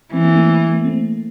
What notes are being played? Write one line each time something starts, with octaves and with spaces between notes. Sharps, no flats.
E3 C4
A#3
A3 C4
A3
A#3
A3 C4